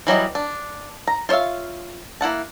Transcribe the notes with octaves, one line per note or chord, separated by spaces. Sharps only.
E3 F#3 G3 D#5
D4
A#5
F4 C5 C#5 E5 F5
A#3 E4 F#5 A5